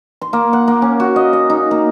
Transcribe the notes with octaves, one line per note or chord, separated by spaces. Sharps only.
C6
A#3
F#5
A#3
C#4
F#4
D#5
D#5
D#4
A#3